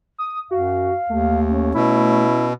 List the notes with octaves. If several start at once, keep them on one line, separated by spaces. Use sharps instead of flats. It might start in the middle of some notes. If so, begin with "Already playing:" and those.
D#6
F#2 F#4 F5
D#2 A3
C#4
B2 E4